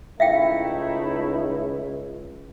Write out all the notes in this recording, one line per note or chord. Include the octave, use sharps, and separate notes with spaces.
C#2 A3 D#4 E4 E5 F5 G5